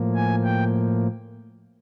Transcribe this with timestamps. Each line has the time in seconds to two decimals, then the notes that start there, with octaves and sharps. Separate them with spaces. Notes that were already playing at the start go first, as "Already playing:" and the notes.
Already playing: A2 F3 A#3
0.14 G#5
0.44 G5